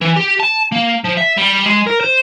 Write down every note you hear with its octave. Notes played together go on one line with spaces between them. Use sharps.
E3
G4
A5
A#3
F3
E5
G3
G#3
A#4
C5